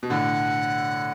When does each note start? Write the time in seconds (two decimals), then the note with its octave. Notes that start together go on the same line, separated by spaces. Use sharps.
0.03 B2
0.10 A2 D3 F#5